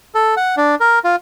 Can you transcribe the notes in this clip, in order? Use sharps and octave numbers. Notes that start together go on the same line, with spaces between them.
A4
F#5
D4
A#4
F4